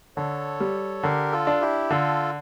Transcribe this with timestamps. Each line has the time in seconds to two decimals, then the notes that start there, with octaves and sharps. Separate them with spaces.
0.16 D3 A4 C#5
0.60 G3
1.03 D3 G4 A#4
1.32 F4 A4
1.47 D4
1.61 E4 G4
1.90 D3 F4 A4